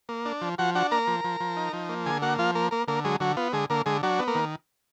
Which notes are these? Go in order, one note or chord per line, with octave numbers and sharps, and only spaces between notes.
A#3
D4
F3
F3 F#4 F#5
D4 F#4 F#5
A#3 A#4 A#5
F3
F3
F3
D#4
F3
A#3
D3 G#4 G#5
A#3 F#4 F#5
F3 F4 F5
A#3 A#4
A#3 A#4
D3 A#3 A#4
F#3 G#3 G#4
D3 F#3 F#4
B3 F4
D3 G#3 G#4
D3 A#3 A#4
D3 G#3 G#4
F#3 D4 F#4
B3
A#3 A#4
D#3